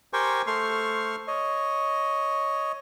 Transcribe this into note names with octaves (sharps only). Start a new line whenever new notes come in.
G4 A#4 C5 G5 G#5 C#6
A3 A4 C5 C6 C#6 F6
C#5 D#5